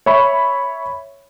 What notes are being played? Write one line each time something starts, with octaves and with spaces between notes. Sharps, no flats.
C#5 E5 B5 C#6